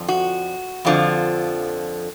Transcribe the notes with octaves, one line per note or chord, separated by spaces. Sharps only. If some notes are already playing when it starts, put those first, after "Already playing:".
Already playing: F2 D3 F3
F#4
F2 D3 F3